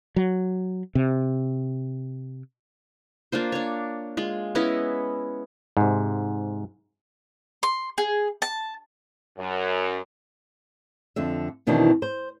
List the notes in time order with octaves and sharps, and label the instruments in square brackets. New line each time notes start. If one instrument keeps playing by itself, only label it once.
[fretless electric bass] F#3
C3
[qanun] A#3 D4 F4 C5
D4 C#5
G#3 F4
B3 C#4 E4 D#5
[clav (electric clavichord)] G#2 C3
[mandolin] C6
G#4
A5
[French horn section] F#2
[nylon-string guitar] F2 D3 E5
F2 B2 D#3 E3 C4 D4
C5